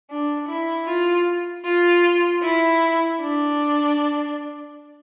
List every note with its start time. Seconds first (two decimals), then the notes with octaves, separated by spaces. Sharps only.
0.10 D4
0.48 E4
0.88 F4
1.65 F4
2.42 E4
3.21 D4